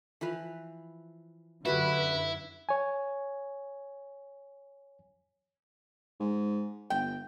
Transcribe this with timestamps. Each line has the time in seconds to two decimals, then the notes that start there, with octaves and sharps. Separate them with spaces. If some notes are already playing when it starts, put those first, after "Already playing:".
0.21 E3 F3 B4
1.65 F#2 D3 E4 F#4 G4 B4
2.69 C#5 G#5
6.20 G#2
6.90 G1 G5